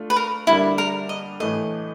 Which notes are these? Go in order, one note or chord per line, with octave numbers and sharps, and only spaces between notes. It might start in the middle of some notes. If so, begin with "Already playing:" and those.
Already playing: A3 D4 F4
B4
A#4
D3 G3 A#3 D4 E4
A#4
D#5
A2 E3 A3 D#5